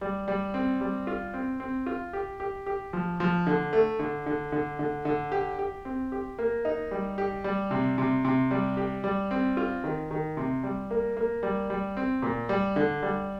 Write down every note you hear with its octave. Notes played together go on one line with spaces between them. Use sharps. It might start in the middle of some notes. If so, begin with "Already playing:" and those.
G3
G3
C4
G3
F4
C4
C4
F4
G4
G4
G4
F3
F3
D3
A3
D3
D3
D3
D3
D3
G4
G4
C4
G4
A#3
D#4
G3
G4
G3
C3
C3
C3
G3
G4
G3
C4
F4
D#3
D#3
C3
G3
A#3
A#3
G3
G3
C4
A#2
G3
D3
G3